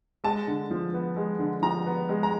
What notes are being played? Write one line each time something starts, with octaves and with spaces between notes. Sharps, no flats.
G#3 A5
D3
F3
B3
G#3
D3
F3 A#5
B3
G#3
A#5